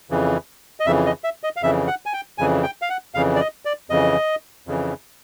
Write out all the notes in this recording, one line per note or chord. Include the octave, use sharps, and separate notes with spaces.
F2 C#3 E3
D#5
F2 C#3 E3 E5
D#5
E5
D#5
F5
F2 C#3 E3 E5
F#5
G#5
G5
F2 C#3 E3 G#5
G5
F5
F#5
F2 C#3 E3 F5
D5
D#5
D5
F2 C#3 E3 D#5
F2 C#3 E3